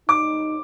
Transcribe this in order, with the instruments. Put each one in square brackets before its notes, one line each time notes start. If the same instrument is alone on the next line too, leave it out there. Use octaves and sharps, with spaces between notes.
[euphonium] D#4 [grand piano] D6